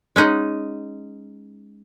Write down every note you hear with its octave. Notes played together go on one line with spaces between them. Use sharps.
G#3 C#4 D#4 F#5